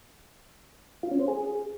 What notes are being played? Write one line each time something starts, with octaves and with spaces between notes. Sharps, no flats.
F4
C#4
C5
G#4